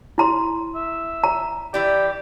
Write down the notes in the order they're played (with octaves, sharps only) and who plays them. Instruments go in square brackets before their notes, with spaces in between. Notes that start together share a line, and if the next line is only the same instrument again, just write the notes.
[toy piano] E4 A#5 C6
[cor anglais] E5
[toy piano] A#5
[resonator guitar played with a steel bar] E3 E4 D5 [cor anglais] G4